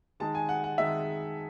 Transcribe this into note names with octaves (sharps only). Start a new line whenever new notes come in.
D#3 G#3 D#4 A5
G#5
F#5
F#5
D#3 G#3 D#4 E5